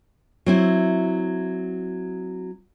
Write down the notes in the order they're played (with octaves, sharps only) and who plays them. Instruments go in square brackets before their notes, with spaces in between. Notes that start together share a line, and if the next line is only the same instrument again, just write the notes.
[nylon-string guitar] F#3 C4 E4